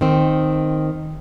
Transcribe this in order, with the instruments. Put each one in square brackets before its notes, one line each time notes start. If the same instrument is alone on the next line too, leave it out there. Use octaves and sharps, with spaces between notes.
[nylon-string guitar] D#3 C4